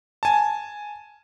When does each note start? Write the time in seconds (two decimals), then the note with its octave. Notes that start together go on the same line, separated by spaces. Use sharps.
0.23 G#5 A5